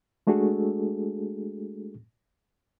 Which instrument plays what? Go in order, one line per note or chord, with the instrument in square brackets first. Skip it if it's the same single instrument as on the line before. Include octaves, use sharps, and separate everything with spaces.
[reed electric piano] G#3 A3 D4 F#4 G#4 A4